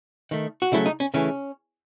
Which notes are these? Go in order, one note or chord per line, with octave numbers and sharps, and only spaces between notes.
D#3 A3
F#4
C#3 F#3 A3 E4
D#4
C#4
C#3 E3 A3 C#4